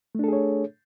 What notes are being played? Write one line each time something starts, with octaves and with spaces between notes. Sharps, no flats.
A3 D4 G#4 A4 C#5